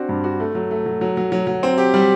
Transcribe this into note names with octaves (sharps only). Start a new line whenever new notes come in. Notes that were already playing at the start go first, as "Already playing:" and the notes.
Already playing: C4 D4 F#4
G2
F#4
A3
F#3
A3
F#3
F#3
F#3
F#3
F#3
C4
G4
G3